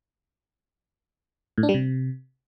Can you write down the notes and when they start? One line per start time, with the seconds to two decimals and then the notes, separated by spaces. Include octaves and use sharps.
1.58 A2
1.63 D4
1.69 G3
1.74 C3